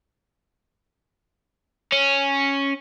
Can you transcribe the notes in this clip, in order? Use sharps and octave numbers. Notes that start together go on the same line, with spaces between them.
C#4